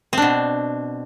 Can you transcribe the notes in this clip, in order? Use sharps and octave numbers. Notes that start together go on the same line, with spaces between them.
B2 C4 D4